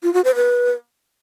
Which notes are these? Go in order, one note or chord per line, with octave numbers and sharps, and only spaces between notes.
F4
F#4
C5
B4